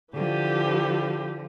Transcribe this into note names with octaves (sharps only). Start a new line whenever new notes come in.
D3 E3 F3 G4